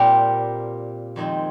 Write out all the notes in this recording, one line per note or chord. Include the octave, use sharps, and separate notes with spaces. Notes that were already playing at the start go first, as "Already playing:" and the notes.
Already playing: A#2 G3 C4 G4 A#4
F2 D#3 G#3 C4